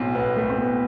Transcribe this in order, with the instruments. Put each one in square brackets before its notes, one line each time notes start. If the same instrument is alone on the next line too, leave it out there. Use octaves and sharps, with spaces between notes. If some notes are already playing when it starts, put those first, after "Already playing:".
Already playing: [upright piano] B1 A2 [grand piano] C4
[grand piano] B3
A3
C4
B3